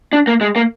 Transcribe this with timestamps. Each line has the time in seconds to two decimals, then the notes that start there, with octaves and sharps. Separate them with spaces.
0.13 D4
0.27 A#3
0.41 G#3
0.56 A#3